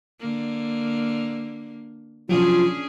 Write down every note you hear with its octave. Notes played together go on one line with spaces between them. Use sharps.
D3 A#3
C3 F3 F#3 C#4 D4 F4 G#4